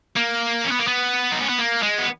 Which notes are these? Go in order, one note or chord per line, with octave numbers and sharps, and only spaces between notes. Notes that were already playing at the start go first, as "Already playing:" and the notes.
A#3
C#4
B3
A#3
B3
D#4
C#4
B3
A#3
G#3
B3